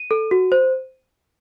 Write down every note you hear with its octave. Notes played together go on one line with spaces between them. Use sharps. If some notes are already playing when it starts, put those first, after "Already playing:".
Already playing: D#7
A4
F#4
C5